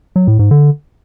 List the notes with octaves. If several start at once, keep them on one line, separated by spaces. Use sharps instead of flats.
F#3
A2
G#2
D3